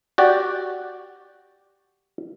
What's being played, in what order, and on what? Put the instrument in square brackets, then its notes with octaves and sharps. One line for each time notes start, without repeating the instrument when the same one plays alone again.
[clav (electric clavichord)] F#4 G4 D5